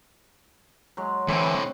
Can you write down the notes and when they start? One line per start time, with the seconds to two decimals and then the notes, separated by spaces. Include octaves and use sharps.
0.97 F#3 G#3
1.28 A2 D3 E3 G#3 C4